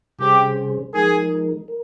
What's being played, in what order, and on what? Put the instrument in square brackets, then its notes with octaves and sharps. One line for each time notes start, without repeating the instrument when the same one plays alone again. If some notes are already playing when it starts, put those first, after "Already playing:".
[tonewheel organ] C3 G3 C#4 G#4 C5 [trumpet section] G4
[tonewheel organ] F3 G#3 D#4 A#4 [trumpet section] G#4
[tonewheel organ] A#4